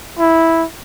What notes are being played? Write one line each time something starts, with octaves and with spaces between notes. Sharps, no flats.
E4